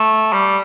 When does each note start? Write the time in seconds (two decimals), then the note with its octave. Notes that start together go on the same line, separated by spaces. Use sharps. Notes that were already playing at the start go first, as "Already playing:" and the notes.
Already playing: A3
0.33 G3